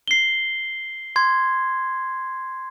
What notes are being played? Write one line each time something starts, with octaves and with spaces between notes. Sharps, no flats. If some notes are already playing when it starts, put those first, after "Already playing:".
C7 G7
C6 G#6